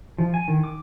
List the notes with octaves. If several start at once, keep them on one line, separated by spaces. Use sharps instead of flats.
F3
G#5
D#3
D6